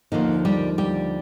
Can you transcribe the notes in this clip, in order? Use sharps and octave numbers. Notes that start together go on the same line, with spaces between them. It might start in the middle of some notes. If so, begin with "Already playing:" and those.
D#2 D3 D#3 F3 A#3 D#4
G3 G4
G3 G4